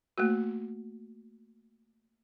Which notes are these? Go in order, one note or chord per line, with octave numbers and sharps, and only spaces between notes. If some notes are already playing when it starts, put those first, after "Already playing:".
A3 A#3 F#4